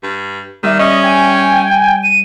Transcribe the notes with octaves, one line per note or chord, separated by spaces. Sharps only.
G2
D#3 G3 E5
C#4 D#5
G5 G#5
D#7